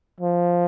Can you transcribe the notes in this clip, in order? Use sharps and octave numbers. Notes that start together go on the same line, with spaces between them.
F3